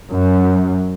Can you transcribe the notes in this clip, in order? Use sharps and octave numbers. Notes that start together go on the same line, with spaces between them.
F#2